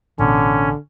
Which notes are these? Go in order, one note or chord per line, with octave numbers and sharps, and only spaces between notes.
A1 B2 D3 C#4